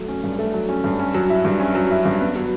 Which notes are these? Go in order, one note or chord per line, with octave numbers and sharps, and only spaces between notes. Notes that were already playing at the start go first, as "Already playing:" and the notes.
Already playing: F#3 A3
C#4
G2
A3
F#3
C#4
G2
C#4
F#3
E4
G2
C#4
F#3
E4
G2
B3
F#3